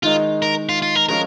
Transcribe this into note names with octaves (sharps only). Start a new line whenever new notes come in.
D#3 G#3 D#4 F4
A#4
F4
F4
A#4
F3 G#3 C#4 F4 A#4